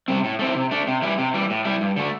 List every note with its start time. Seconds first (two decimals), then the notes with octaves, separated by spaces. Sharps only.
0.08 C3 G3 C4
0.24 A2
0.39 A3 C4 E4
0.55 C3
0.71 A3 D4
0.87 C3
1.02 E3 G3 E4
1.18 C3
1.34 E3 G3
1.50 A2
1.65 G3 E4
1.81 G2
1.96 D3 A3